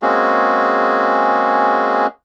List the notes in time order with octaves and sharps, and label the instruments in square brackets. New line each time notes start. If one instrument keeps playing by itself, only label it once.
[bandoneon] G#3 A#3 C4 C#4 F#4 G#4